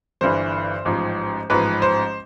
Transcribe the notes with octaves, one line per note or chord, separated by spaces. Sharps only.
G1 G2 E3 C5
A1 G#2 F3
A1 G#2 F3 B4
C5